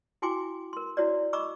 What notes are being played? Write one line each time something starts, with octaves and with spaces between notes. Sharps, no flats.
E4 F#4 G5 G#5 C6 D6
A#4 C6
E4 F#4 C#5 D5
D#5 A#5 B5 C#6 D6 E6